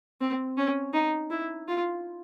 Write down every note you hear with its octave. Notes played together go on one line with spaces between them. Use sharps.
C4
C#4
D#4
E4
F4